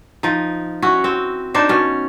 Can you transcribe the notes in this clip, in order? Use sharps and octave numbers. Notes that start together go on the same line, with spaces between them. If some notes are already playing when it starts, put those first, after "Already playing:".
F3 D#4
C#4 E4 F#4
C4
D4 D#4 C5 D5
B2 C#4